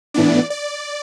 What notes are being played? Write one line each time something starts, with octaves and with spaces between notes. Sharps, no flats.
A2 E3 B3 D4 D5
D5